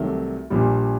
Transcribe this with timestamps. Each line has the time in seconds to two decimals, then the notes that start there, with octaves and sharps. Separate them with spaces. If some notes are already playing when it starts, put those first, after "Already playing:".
Already playing: C2 C3 D#3 F#3 A3
0.50 A#1 A#2 G3